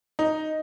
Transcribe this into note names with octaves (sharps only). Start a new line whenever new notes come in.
D#4